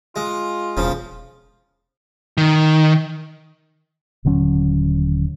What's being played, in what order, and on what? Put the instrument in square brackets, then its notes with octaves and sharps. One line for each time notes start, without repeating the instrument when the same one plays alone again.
[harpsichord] G#3 [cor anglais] F4
[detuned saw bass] E1 [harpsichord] C#3 F3
[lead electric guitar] D#3
[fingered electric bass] D#1 D3 F#3 C#4